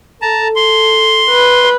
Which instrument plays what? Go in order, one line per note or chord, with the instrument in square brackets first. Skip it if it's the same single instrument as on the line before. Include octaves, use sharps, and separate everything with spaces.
[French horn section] A4 [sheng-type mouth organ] A5 A#5
[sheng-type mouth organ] C6
[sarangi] B4